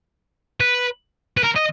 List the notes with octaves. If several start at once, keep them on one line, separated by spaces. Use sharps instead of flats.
B4
B4
A#4
D#5